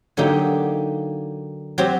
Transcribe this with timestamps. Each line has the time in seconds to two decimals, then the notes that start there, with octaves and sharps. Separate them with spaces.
0.17 D3 F#3 A#3 D#4 G4
1.78 F#3 C4 G4